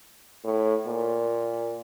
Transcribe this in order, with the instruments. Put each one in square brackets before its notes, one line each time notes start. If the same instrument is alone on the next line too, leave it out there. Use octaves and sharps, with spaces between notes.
[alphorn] A2
A#2